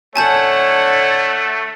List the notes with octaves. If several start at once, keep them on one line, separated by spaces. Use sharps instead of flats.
D3 A3 C#5 F#5 G#5 A5 G6